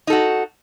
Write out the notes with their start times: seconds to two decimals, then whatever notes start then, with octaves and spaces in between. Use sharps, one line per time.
0.07 D#4
0.10 A4
0.12 F#4